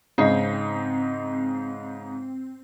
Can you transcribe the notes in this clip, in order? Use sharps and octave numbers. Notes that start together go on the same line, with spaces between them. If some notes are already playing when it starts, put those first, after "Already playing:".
G#2 C#3 C4 D#4